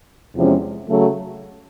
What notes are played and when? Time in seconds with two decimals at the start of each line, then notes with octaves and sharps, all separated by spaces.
0.36 E2 C3 F3 G#3 C#4
0.89 C#3 F#3 A3